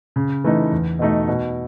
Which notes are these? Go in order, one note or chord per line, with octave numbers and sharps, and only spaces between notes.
C#3
E3 A3 D#4
E2
B2 A3 D#4
B2